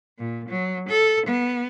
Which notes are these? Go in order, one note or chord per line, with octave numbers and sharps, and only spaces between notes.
A#2
F#3
A4
B3